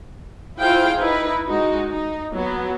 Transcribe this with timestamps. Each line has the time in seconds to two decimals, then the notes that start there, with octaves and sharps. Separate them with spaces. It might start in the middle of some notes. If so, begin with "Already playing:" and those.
0.58 E4 F4 G#4 C5 F5 G5
0.98 D#4 E4 B4
1.48 G#3 D#4 F#4
1.89 D#4
2.35 F#3 B3 F#4